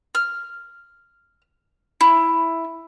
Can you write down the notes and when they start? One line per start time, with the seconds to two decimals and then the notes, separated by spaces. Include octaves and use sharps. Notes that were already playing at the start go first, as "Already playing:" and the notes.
0.15 F6
2.01 E4